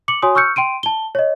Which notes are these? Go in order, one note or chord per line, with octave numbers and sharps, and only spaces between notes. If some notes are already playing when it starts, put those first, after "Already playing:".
D6 C#7 F#7
F#4 C#5 G#5 C6 D#6
C#6 E6 F6 G6 C#7
G5 C6 D7 D#7
A5 G7
C#5 D#5